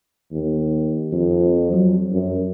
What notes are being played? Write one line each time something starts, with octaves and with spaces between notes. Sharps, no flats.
D#2
F2
F#3
F#2